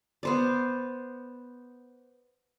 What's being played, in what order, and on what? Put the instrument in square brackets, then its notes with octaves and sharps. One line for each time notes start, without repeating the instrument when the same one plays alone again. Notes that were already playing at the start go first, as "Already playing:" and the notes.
[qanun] B3 C5 D5